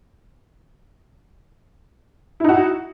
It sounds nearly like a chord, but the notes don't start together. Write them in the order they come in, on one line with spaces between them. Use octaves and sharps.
E4 D#4 F#4